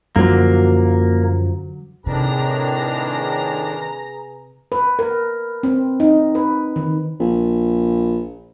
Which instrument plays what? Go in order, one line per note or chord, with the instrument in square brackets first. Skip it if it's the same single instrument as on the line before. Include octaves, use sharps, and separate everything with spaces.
[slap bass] F#2 F3 [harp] D3 F#3 [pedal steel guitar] A#3
[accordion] A2 D#3 D4 [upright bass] C3 [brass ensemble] G#4 B4 A#5
[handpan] B4
A#4
C4
D#4
B4
D#3
[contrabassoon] A#1